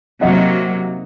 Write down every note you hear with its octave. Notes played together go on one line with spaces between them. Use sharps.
C3 F#3 A#3 D#5 F#5